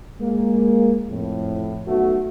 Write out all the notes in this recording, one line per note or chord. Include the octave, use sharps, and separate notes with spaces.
G#3 A#3
F2 A2
B1 A3 F#4